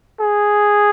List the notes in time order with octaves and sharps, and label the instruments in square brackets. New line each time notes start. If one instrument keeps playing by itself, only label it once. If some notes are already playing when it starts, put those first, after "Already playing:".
[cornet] G#4